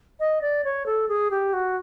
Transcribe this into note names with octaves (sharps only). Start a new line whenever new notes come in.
D#5
D5
C#5
A4
G#4
G4
F#4